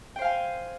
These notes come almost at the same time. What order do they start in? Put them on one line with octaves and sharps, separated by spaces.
G5 C5 F5 G#5